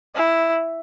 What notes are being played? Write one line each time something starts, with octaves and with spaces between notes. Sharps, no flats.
E4